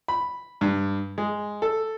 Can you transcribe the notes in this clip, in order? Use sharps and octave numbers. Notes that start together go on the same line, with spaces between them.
B5
G2
G#3
A4